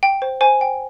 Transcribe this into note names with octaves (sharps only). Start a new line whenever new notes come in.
G5
C5
C5 G#5
G5